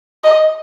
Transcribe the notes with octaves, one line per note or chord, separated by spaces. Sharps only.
D#5